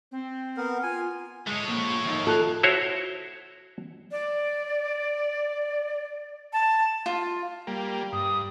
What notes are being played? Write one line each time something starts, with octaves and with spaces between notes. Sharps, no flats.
C4
B3 A#4
F4 G#5
G#3 A3 C#5
A#2 F3
D#2 D#4
F4 A4 F#6 F7
E4 F#4 C5 C#5
D5
A5
F4
G3 A#3
G2 D#6